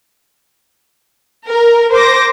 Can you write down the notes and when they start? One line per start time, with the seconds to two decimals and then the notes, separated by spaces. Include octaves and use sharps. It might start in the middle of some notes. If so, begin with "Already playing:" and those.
1.47 A#4
1.94 C5 D6 A#6